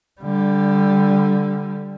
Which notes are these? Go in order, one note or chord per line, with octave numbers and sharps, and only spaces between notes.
D3 G3